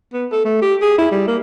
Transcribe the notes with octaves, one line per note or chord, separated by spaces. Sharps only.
B3
A4
A3
G4
G#4
E4
G3
A#3